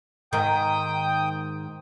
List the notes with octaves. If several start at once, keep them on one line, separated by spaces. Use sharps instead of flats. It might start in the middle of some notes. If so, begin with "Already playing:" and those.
G#2 D#3 G5 D#6 G6